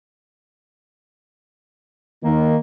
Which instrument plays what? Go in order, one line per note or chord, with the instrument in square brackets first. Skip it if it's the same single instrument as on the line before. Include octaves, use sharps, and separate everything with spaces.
[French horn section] D#3 [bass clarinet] A#3